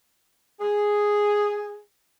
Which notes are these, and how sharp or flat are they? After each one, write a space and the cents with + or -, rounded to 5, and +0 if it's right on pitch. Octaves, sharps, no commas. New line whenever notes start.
G#4 -5